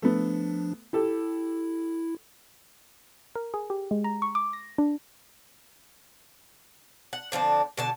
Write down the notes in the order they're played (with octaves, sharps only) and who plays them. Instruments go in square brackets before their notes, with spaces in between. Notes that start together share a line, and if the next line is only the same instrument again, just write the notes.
[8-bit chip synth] F3 D4 [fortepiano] A3 B3
[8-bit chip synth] E4 [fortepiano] G4 A4
[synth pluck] A#4
G#4
G4
G#3
A#5
C#6
D6
A#6
D4
[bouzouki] F#5
D3 F3 C4 D4
B2 D3 A5